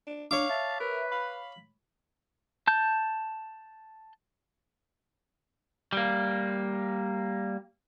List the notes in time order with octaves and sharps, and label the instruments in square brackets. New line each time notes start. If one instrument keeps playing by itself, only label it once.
[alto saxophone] D4
[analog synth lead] D4 [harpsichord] C#5 D6 [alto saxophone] F5
[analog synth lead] E5 [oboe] A5
[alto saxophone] A#4 [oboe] B4
[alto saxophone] F5 [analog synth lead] B5
[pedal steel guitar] A5 G6
[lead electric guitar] G3 A#3